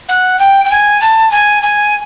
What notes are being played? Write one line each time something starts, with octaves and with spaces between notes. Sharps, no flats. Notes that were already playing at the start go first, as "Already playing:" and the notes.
F#5
G5
G5
G#5
A5
G#5
G#5